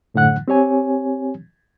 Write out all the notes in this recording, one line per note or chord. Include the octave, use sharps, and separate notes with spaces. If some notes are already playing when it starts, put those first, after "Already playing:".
F#2 A2 D3 F#5 F#6
C4 G4 C#5 G#5